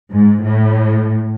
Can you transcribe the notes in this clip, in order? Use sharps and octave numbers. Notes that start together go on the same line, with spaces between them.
G#2
A2